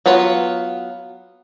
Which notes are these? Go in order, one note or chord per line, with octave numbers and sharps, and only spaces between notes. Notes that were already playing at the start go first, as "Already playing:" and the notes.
F#3 B3 F4 C#5